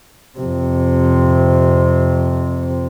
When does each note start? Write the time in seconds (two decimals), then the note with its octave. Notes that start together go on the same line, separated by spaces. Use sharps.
0.39 F2 C3